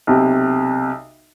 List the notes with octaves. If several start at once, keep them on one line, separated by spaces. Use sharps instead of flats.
B1 C3